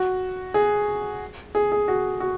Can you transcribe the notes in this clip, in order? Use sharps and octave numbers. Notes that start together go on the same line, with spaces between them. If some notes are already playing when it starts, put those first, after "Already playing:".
Already playing: F#4
G#4
G#4
G#4
F#4
F#4